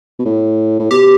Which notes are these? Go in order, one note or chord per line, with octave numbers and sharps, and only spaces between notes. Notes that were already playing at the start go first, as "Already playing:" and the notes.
B2
A2
A2
B2 G4